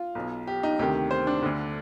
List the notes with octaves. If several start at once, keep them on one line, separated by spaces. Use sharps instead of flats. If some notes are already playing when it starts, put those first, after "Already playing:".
Already playing: F4
B1 B2
G4
D#4
D2 C3 D#3 G4
C5
D4
D2 D3